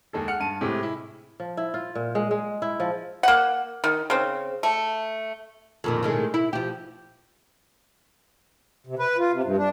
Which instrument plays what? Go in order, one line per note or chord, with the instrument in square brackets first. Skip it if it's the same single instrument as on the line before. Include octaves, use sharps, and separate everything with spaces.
[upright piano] D#2 G#3 A4
F#5 F6 C#7
G2 A5 D#7
A2 C3 G#3 G4
E4
[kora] F3
E4
F4
A#2
G#3
G#3
E4
F3
[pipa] A#3 F#5
D#3
C#3 C4
A3
[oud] F2 A#2 D#3
A2 D#3 G#3
E4
F3 G4
[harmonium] C3
B4
F4
C3
G2
D4